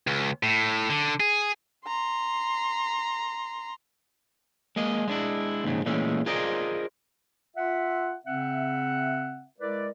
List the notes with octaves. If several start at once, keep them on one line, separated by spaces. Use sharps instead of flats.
C#2
A2
D3
G#4
A#5 C6
G#3 A#3 D#5
G#3 D4 E4
D#2 G#2 C#3
A#2 E3 G#3 A3 C#4
F4 G#4 A#4 C5 D5 D#5
F4 E5 F#5
C#3 C4 E5 F#5
G#3 E4 A#4 B4 D5